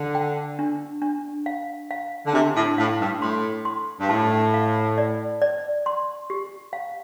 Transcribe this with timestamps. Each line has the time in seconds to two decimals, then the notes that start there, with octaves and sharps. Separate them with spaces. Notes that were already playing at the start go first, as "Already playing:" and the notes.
Already playing: D3
0.15 G5
0.59 D4
1.02 D4
1.46 F5
1.91 F5
2.26 D3
2.33 C3 D4
2.56 A2
2.78 A2 F5
3.00 G2
3.22 A2 C6
3.65 C6
4.00 G2
4.09 A2 A5
4.54 F5
4.98 D5
5.42 D5
5.86 C6
6.30 G4
6.73 F5